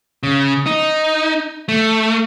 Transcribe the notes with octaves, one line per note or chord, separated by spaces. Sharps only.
C#3
D#4
A3